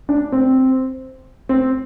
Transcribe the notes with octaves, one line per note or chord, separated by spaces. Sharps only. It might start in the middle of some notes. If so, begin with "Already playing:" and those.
D4
C4
C4